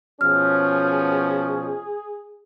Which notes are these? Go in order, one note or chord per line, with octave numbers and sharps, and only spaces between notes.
B2 F3 C#4 G#4 F6